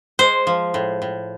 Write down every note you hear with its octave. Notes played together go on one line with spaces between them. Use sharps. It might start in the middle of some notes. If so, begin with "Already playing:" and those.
G#3 C5
F3
A2
A2